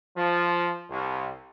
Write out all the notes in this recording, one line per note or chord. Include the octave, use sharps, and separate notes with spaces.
F3
C2